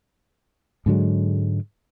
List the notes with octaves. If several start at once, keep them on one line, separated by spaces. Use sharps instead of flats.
G#2 D3 F#3 G#3